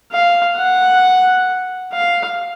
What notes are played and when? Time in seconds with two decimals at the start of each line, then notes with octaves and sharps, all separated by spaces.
0.12 F5
0.57 F#5
1.93 F5